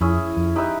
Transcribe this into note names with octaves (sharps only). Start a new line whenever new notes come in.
F2 C#4 E4 G#4
F2
D#4 G4 B4 E5